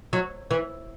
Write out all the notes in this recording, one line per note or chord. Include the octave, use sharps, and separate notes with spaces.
F#3
E3